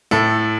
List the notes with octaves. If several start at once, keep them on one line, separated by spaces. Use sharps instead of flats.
A2 A4